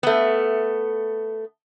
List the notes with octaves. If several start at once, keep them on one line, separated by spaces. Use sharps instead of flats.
A3 B3